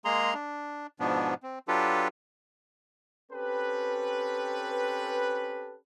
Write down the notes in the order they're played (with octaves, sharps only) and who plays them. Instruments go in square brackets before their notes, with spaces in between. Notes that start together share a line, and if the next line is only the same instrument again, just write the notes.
[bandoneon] G#3 A#3 G#4 A#5 C6
D4
G#2 B2 F3 B3 D4
C4
F#3 D4 F4 G4 A4 B4
[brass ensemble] C4 C#4 G4 A4 B4